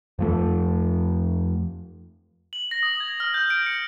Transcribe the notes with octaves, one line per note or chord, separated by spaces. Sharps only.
F2 F3 A3
F#7
A#6
D#6
G#6
F6
G6
D7
C#7